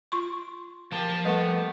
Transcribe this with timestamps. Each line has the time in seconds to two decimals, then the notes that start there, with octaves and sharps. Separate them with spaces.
0.12 F4 C6 C#6
0.92 F3 A#3 G4 A5
1.25 G3 A3 B3